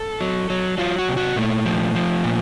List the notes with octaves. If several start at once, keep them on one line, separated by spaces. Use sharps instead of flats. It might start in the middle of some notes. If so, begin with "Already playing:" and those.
Already playing: A4
F#3
F#3
F#3 F4
F#4
C3
F#4
A#2 A3
F3
F3
A#2